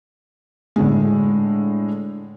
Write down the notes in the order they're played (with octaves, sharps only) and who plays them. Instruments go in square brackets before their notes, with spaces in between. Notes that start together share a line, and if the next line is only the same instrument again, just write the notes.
[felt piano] A2 D3 G#3